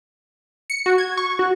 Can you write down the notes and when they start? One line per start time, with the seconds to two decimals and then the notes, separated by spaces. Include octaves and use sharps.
0.70 C#7
0.86 F#4
0.98 G#6
1.17 C#6
1.39 F#4